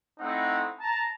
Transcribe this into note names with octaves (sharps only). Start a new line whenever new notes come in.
A3 C4 D#4 E4 F#5
A5 A#5